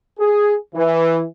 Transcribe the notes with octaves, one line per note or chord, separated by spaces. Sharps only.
G#4
E3